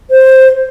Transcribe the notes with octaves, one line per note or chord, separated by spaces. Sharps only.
C5